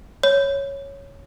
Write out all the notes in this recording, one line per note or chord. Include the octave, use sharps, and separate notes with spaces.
C#5